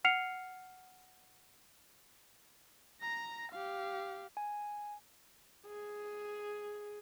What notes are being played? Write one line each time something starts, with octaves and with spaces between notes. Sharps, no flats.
F#5 F6 C7 C#7 F7
A#5 A#6
G4 F5
G#5
G#4